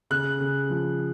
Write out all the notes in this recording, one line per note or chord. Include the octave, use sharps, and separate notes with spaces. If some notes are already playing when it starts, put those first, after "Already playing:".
C#3 F#6
C#3
F3